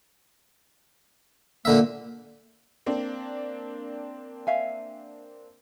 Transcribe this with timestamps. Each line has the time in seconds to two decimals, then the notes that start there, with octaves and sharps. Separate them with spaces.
1.65 A#2 D3 A#3 E5
2.86 A#3 C4 D4
4.47 E5 F5 G#5